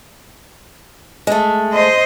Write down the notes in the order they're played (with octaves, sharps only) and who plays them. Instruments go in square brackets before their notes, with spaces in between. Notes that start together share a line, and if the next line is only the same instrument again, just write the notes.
[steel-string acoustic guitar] G#3 A3
[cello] C5 D#5